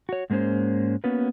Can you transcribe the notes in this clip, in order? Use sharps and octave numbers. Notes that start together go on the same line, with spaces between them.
F#4 C#5
G#2 G#3 A#3 C#4 C5
A#3 B3 C#4 F#4 B4